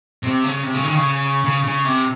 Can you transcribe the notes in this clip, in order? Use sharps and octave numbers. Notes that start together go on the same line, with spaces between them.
C3
C#3
C3
C#3
D#3
C#3
C#3
C#3
C3